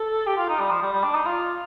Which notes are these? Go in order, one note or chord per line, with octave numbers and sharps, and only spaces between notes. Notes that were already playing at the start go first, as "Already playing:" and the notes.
Already playing: A4
G4
F4
D#4
G3
F3
G3
G3
D4
D#4
F4